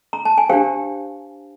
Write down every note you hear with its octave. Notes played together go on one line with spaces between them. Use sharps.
A#5
A5
G#5
D4 G4 C5 F5 G5